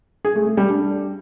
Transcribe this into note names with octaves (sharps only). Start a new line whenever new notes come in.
G#4
A3
A3
G3
D4